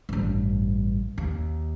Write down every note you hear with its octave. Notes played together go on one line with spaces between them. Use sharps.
A1 G2
D#2